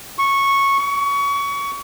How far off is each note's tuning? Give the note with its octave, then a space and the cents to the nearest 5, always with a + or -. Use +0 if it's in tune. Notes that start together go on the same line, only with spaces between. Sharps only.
C#6 -10
C#6 +25